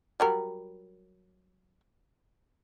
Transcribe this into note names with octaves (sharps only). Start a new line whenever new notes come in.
F#3 G3 A#4